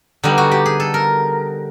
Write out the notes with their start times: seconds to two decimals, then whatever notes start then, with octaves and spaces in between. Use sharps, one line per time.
0.23 D3 G3 B3 D#4
0.38 F#4
0.51 G4
0.66 G#4
0.80 A4
0.94 A#4